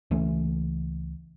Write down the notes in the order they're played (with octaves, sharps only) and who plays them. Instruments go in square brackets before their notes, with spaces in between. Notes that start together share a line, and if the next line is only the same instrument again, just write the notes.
[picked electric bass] C#2 E3 A3 C#4